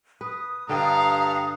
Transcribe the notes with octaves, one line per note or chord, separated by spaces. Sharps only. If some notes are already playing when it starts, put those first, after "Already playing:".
B4 D#6
G2 D3 D#5 F5 G5 A#5